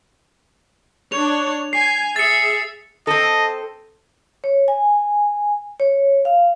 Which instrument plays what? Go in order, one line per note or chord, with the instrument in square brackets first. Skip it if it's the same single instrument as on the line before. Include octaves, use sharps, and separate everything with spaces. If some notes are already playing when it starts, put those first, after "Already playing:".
[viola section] D4 C#5 [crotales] F7
[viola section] G#5 [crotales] C7
[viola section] G#4 E5 [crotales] A6 C#7
[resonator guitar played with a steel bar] C4 A4 [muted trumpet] D#5
[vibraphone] C#5
G#5
C#5
F5